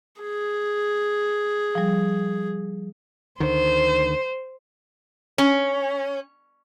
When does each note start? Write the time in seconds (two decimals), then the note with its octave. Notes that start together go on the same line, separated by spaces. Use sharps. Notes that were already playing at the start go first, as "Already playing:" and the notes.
0.22 G#4
1.75 F3 G3
3.40 D2 D3 D#3 C5
5.38 C#4